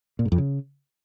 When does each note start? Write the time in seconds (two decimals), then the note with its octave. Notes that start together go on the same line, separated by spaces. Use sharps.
0.19 A#2
0.25 G#2
0.32 F2
0.38 C#3